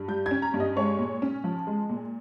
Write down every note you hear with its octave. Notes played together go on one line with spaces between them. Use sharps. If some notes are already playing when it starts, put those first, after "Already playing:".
Already playing: G2
G3 G6
G#6
C#4
A#5
G2
D#5
G#3 C#5
A#2
C#4
F3
G#3
A#2